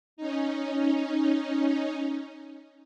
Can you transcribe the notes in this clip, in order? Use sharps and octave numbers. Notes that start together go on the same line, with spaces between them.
C#4 D#4